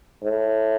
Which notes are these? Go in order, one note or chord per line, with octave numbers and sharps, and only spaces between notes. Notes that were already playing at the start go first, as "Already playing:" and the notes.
A2